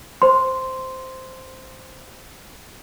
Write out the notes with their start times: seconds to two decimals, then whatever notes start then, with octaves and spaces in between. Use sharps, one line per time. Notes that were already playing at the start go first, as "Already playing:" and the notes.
0.22 C5 C6